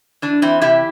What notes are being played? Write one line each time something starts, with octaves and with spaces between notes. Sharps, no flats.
E3 D4
E3 C4 E4
C3 E4 G4